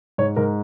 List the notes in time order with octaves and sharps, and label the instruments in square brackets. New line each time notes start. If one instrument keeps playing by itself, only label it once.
[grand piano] G#2 C#5
G#2 A#4